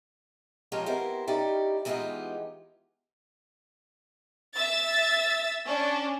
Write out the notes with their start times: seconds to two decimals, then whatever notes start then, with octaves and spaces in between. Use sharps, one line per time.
0.72 F3 G#3 C#4 F4 G4 A#5
0.86 B3 C4 E4 G4 A#4 C5
1.27 G3 C#4 D#4 E4 G4 D5
1.85 E3 G#3 B3 D#4 F4 G4
4.56 E5 E6 A6
5.66 C#4 D4